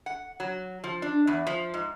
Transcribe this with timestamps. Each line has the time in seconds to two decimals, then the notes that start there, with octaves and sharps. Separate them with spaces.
0.06 F#5
0.40 F#3
0.84 F3
1.02 D4
1.27 E2
1.47 F3
1.74 G#2